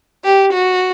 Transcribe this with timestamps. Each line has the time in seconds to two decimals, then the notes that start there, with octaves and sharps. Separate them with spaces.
0.24 G4
0.53 F#4